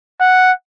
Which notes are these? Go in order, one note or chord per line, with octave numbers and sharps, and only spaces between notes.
F#5